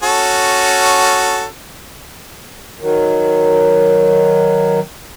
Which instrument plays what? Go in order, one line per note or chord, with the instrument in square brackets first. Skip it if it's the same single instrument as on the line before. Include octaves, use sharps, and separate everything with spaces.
[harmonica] C#4 F#4 A4
[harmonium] D#3 F#3